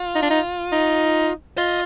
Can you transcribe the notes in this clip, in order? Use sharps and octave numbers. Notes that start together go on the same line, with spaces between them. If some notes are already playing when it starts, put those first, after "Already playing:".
Already playing: F4
D#4
D4
D#4
D#4
F4 D#5